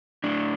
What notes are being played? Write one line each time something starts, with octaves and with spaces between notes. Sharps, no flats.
A2 D4